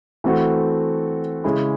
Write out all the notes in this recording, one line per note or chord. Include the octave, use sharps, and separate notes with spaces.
E3 A3 C4 F#4 A4
C#3 G#3 C#4 E4